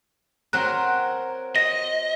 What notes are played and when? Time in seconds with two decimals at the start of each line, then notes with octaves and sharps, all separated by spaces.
0.53 F#3 C4 A#4 F#6
1.56 D#5 A#6